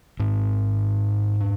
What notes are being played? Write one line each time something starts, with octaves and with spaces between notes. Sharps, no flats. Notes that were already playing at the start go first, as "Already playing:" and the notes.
G#2 C4
D4